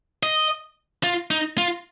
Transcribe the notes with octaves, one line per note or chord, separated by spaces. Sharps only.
D#5
F4
D#4
F4